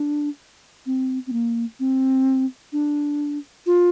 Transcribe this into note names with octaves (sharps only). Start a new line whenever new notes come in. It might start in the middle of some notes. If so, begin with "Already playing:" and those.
Already playing: D4
C4
C4
A#3
C4
D4
F4